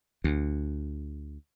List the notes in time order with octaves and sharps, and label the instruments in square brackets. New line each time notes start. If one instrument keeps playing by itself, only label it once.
[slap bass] D2